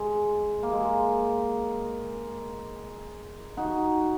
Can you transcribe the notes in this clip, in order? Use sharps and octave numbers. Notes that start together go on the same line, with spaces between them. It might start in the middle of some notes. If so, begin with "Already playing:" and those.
Already playing: G#3
A#3
G#3
D#4 F#4